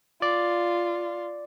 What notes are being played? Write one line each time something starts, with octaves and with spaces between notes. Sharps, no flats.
F4 D5